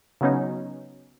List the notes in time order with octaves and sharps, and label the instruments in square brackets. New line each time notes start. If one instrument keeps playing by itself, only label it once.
[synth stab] C#3 F#3 B3 C#4 D#4